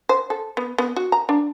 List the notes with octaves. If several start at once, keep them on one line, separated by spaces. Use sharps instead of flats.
C5
A4
B3
B3
F#4
A#5
D4